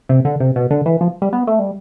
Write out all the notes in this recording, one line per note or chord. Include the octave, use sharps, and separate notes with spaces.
C3
D3
C3
B2
D3
E3
F3
G3
B3
A3
G3